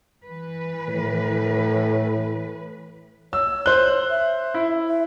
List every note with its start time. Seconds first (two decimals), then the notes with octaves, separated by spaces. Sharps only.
0.24 E3 B4
0.88 A2
3.33 C#5 E6
3.66 C5 F#6 G7
4.10 E5
4.54 E4
4.87 E5